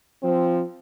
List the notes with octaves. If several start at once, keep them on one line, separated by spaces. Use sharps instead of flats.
F3 C4